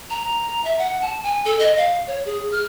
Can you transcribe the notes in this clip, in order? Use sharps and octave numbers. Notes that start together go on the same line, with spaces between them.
A#5
E5
F#5
A5
G#5
A4
D#5
F5
C#5
G#4
F6